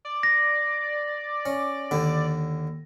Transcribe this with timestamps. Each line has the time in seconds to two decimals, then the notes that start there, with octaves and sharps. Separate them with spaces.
0.05 D5
0.23 A#6
1.46 C#4
1.91 D#2 D3